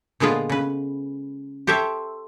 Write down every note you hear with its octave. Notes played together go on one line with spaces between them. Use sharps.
A#2 D3 G#3 B3 F4 B4
C#3 B4
G4 A4 C5 C#5 E5